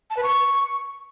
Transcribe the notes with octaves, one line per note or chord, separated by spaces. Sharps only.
A5
B4
C#6